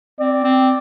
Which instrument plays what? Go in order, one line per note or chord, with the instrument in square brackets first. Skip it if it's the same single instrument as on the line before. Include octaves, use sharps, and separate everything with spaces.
[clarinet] C4 [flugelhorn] D5
[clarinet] C4